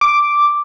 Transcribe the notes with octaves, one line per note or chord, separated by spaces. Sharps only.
D6